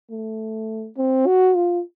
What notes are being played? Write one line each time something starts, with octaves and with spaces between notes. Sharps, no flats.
A3
C4
F#4
F4